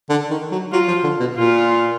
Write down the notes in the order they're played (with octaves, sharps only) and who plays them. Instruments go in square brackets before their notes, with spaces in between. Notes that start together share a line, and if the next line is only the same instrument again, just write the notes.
[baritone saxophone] D3
D#3
F#3
[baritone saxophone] F#3 [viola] F4
[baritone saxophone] F3
D3
B2
[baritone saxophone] A#2 [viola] F4